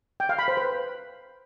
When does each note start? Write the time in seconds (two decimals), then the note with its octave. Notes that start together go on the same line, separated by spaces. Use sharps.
0.20 G5
0.29 F5
0.39 B5
0.48 C5
0.57 B4